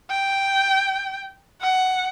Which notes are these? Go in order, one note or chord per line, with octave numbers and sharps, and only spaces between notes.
G5
F#5